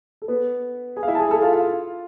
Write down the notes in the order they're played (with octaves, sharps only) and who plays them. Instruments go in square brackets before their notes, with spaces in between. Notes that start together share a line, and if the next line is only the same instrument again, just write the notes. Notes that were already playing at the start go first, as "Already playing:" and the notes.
[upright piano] A4
B3 B4
G#4 G#5
F5
E4 E5
A5
G#4 G#5
A4 A5
F4 F5
F4 F5